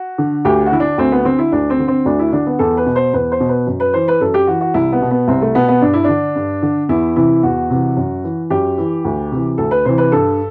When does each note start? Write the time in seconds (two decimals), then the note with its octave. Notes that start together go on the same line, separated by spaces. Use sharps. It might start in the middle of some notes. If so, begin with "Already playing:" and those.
Already playing: F#4
0.18 D3
0.45 D2 G4
0.66 F#4
0.72 D3 E4
0.80 D4
0.98 D2 C4
1.12 B3
1.25 D3 C4
1.39 E4
1.52 D2 D4
1.70 C4
1.79 D3
1.88 C4
2.05 D2 D4
2.19 E4
2.33 D3 D4
2.46 B3
2.59 E2 A4
2.77 B4
2.86 B2
2.96 C5
3.13 E2 B4
3.32 C5
3.40 B2
3.49 B4
3.67 F#2
3.80 B4
3.94 E3 C5
4.08 B4
4.21 F#2 A4
4.34 G4
4.47 E3 F#4
4.61 F#4
4.74 C2 E4
4.92 B3
5.02 B2
5.11 B3
5.28 C2 C4
5.41 A3
5.55 B2 B3
5.69 B3
5.82 G2 D4
5.93 E4
6.04 D3 D4
6.36 G2
6.62 D3
6.89 E2 E4
7.16 C3 E3 E4
7.43 E2 F#4
7.70 C3 E3
7.97 F#2
8.24 E3
8.50 F#2 G4
8.78 E3
9.05 D2
9.31 C3 E3
9.58 D2 A4
9.71 B4
9.85 C3 E3 C5
9.98 B4
10.12 G2 A4